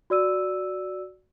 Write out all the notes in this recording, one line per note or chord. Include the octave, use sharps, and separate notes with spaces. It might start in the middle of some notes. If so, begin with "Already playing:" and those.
F#4 D5 E6 D#7